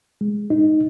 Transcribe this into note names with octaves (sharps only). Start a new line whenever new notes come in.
G#3
D#4